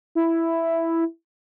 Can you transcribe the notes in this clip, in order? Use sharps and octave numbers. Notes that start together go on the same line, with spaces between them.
E4